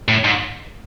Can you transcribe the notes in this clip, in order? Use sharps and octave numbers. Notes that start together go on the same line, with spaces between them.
A2
G#2